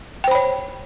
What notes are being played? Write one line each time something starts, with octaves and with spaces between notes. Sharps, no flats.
C5 C#5 G5 B5